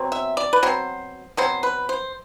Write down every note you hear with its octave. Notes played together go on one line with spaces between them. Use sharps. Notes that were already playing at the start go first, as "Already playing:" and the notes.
Already playing: B2 F#3 C4
E5
D5
B4
B2 F#3 C4 C5
B2 F#3 C4 C5
B4
C5